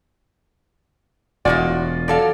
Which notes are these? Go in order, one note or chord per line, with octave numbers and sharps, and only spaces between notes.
E1 E2 A2 F4 F#4 D5 D#5 G#5
F#3 A4 D5 F5